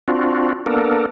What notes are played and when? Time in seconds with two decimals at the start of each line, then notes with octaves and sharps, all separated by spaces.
0.08 C4 D4 F4 F#4
0.66 A#3 B3 D4 A4 A#4